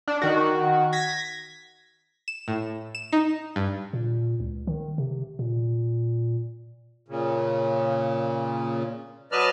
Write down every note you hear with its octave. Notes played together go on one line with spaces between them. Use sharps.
D4
D#3 F#4
G#6 A#6 B6
E7
A2
E7
D#4
G2
A#2
C#2
D#3
C3
A#2
A#2 C#3
F#3 B4 D5 D#5 A5 F6